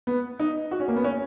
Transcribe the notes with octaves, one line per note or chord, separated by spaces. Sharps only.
B3
D#4
F#4
C#4
A#3
B3
C#4